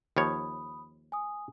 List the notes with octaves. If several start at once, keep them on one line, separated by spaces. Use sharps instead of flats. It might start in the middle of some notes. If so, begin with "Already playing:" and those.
D#2 F3 C#5 B5 D#6
G#5 D#6